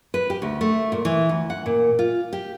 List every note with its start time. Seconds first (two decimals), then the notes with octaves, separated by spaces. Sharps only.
0.14 B4
0.30 G4
0.42 D2
0.61 A3
0.92 A#2
1.05 E3
1.29 D2
1.50 F#5
1.66 A#2
1.99 F4
2.33 G4